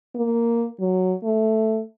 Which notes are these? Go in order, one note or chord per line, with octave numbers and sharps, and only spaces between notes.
A#3
F#3
A3